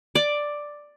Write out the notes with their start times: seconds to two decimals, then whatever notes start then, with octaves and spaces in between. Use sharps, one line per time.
0.15 D5